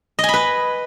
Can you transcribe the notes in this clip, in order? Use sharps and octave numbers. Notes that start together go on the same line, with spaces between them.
D#5
G#5
B5
B4